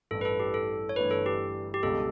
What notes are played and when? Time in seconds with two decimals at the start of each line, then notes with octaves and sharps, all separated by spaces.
0.11 A1 G2 E3 A4
0.21 B4
0.25 A4
0.40 G4
0.54 A4
0.89 C#5
0.96 G1 G2 E3 A3 D4 B4
1.11 A4
1.26 G4
1.74 G4
1.83 C#2 B2 G3 D4 A4